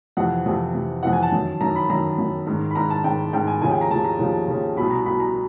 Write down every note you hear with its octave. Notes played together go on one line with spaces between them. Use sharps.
F2 C3 E3 F#5
F2 C3 E3
F2 C3 E3
F2 C3 E3 F#5
G#5
A5
F#2 D#3
F#2 D#3 A#5
B5
F#2 D#3 A#5
F#2 D#3
G#2 D#3
B5
G#2 D#3 A#5
A5
G#2 D#3 G5
G#2 D#3 G5
G#5
D#2 C#3 F3 G#5
G5
A#5
D#2 C#3 F3 A5
A#5
D#2 C#3 F3
D#2 C#3 F3
C2 B2 B5
A#5
C2 B2 B5
A#5